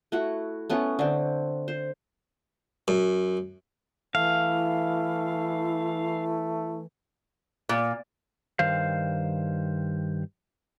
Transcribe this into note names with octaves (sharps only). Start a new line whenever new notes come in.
A3 E4 F#4
A3 B3 C#4
D3 C4
C5
F#2
E3 A3 E4 F5
A#2
G2 D#3 C5 F5